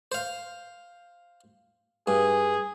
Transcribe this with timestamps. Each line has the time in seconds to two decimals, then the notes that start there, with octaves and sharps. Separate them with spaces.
0.12 C5 F5
2.08 G2 G#4